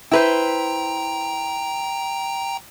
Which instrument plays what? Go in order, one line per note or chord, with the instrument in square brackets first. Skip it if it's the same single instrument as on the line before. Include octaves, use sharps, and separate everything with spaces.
[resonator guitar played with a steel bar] E4 B4 C5 [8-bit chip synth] G5 A#5